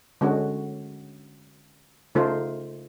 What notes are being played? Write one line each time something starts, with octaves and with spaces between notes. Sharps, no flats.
D3 G#3 C#4 F#4
C#3 A3 D#4 F4 C5